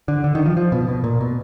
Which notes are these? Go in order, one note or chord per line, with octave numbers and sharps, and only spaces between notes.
D3
D3
D#3
F3
F3
B2
B2
A#2
B2